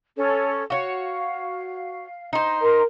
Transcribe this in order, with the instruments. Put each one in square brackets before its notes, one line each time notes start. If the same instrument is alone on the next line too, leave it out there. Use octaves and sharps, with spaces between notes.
[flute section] C#4 A4 C#5
[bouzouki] F#4 C#5 [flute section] F5
[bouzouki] D#4 C5 [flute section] D#5
[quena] A#4 [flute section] A#5 C6